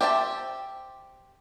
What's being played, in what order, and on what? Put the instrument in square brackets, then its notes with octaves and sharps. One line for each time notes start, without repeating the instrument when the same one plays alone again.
[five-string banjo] G4 C5 E5 G5 A5